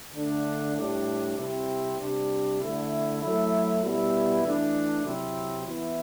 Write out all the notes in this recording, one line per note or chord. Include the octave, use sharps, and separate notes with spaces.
D3 A3 D4
A2 G3 D4
C3 G3 C4 E4
C3 G3 D4
D3 A3 E4
F#3 A3 E4
B2 G3 B3 E4
E3 A3 D4
C3 F#3 C4 E4
E3 B3 E4